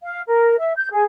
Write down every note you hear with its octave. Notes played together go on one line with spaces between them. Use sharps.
F5
A#4
E5
G6
G#4